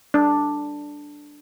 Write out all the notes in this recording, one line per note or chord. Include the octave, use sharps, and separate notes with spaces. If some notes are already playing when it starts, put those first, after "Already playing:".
D4